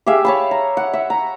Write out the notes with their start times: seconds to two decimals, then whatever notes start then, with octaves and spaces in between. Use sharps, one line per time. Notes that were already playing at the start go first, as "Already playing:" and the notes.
0.06 G4 G#4 E5 F5
0.25 C#5 A5 B5
0.51 A#5
0.77 F#5
0.93 E5
1.10 A#5